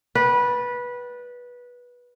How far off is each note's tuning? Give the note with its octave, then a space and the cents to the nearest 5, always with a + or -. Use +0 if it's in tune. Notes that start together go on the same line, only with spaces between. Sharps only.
B4 -15 D5 +0 G5 -35